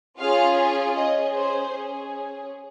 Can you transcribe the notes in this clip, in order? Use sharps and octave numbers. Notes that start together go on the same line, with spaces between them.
C#4 F4 G#4 F5
C#4 G#4 D#5
C5
C#4 G#4